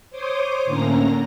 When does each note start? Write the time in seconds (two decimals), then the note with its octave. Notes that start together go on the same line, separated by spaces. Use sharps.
0.10 C5 C#5 C6 D6 D#6
0.65 A2 D3 A#3 C#4 A#5 A#6